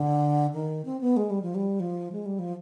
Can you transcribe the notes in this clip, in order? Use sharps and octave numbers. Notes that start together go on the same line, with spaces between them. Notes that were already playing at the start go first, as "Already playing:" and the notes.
Already playing: D3
D#3
C4
B3
G#3
G3
F3
G3
F3
G#3
G3
F3